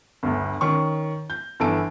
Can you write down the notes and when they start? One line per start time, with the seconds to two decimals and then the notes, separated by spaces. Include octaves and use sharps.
0.23 G1 D2
0.61 D#3 C#4 C#6
1.30 G6
1.60 G1 E3 A4 G#5 A5 D7